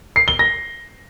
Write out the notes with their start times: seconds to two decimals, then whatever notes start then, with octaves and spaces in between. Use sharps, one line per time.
0.16 C7
0.28 G7
0.39 A#6